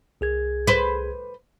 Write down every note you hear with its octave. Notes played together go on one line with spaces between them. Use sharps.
C2 G#4 G#6
B4 C5